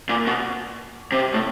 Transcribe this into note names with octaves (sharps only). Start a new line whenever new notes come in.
A#2
B2
C3
A2